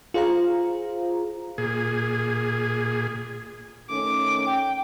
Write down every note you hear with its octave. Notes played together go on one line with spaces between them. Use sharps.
F4 G#4 C5 F5 A#5
A#2 G#4
D#3 A3 C#4 D6
G5